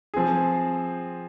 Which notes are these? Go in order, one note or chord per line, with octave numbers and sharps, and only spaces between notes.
F3 C4 G#4